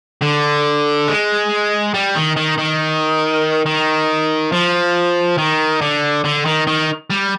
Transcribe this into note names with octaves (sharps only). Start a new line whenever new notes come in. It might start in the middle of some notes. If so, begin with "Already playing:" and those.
D3
G#3
G3
D#3
D#3
D#3
D#3
F3
D#3
D3
D3
D#3
D#3
G3